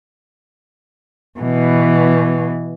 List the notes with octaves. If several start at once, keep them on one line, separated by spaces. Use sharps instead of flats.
B2 E3